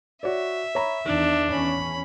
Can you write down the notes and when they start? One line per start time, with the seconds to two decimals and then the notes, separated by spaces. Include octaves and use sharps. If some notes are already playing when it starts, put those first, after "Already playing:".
0.23 F#4 C#5 D5 E5
0.75 C#5 A#5 B5
1.06 E2 D#3 D4
1.50 E2 C#4 B5